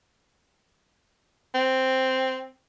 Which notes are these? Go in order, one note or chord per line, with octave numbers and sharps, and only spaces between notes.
C4